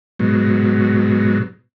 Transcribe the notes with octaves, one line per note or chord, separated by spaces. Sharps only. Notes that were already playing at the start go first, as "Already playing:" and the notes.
G#2 B2 F#3